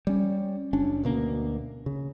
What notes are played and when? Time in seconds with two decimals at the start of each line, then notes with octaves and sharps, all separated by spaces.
0.07 G3 C#4
0.73 F#1 C#4 D4
1.04 D2 B2 A#3
1.86 C#3